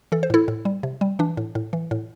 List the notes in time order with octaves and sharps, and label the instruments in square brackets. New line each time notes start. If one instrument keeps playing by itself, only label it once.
[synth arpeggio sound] E3 A4
C5
A2 E4 A4
A2
G3
C3
G3
E3 D4
A2
A2
E3
A2